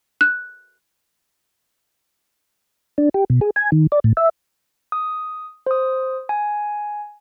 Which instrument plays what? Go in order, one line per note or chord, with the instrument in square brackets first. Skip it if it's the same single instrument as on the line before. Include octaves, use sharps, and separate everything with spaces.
[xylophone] F#6
[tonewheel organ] D4
G4
B2
G#4
G#5
D#3
D5
A2
E5
[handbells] D#6
C5 D#6
G#5